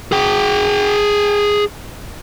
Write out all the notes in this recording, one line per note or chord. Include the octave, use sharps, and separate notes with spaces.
G#4 G5